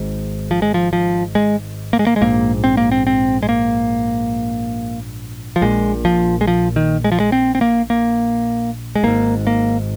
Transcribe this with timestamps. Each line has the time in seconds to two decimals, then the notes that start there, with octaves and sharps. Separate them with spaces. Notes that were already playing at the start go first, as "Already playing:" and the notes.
Already playing: G#1 G#2
0.51 F3
0.62 G#3
0.74 F3
0.93 F3
1.35 G#3
1.93 A#3
1.99 G#3
2.07 A#3
2.16 G#3
2.21 A#1 G#2 A#3
2.64 C4
2.77 A#3
2.92 C4
3.07 C4
3.43 G#3
3.49 A#3
5.56 F3
5.62 A#1 A#2 G#3
6.05 F3
6.41 G#3
6.47 F3
6.76 D#3
7.04 G#3
7.12 F3
7.20 G#3
7.32 C4
7.55 C4
7.61 A#3
7.90 A#3
8.95 G#3
9.03 G#1 G#2 A#3
9.47 A#3